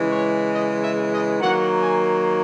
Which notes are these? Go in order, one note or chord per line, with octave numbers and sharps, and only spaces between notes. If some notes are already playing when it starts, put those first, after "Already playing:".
Already playing: C#3 E3 G#3
C#5
D#5
E5
D#5
D#3 F#3 A#3 F#5
G#5